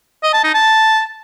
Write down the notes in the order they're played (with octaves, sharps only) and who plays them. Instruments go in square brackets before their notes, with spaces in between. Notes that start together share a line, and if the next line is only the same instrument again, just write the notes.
[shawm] D#5
A5
D#4
A5